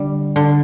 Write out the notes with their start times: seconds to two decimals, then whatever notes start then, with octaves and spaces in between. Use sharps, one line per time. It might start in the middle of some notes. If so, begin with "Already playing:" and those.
Already playing: D3 G3
0.36 D3